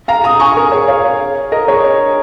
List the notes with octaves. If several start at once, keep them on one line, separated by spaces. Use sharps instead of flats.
F5 A#5
A#5 D#6
G#5 C#6
A#4
G#4 C#5
C#5 F5
A#4 D#5
G#4 C#5